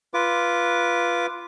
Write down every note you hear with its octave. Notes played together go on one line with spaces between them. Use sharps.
F4 B4 D6